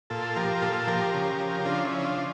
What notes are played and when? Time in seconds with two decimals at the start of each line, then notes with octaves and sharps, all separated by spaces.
0.10 A#2 F4 A4
0.36 F3 G4 A#4
0.61 A#2 F4 A4
0.87 F3 G4 A#4
1.14 C#3
1.40 F3
1.60 G4
1.65 C#3 D4 F4
1.85 C#4 E4
1.91 F3
2.04 D4 F4
2.17 C#3